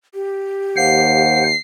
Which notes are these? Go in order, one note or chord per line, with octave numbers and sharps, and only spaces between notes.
G4
D#2 C5 F5 F#5 C7